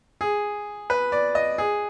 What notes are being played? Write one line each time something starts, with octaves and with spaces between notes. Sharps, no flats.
G#4
B4
D5
D#5
G#4